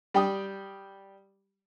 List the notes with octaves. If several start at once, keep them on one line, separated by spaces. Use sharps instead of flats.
G3 G5 D#6